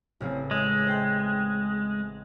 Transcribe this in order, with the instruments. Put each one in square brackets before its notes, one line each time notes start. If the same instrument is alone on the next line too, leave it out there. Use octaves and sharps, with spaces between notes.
[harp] A1 C#3 C4
[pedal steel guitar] G#3 [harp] E5
[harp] C5 G5 G6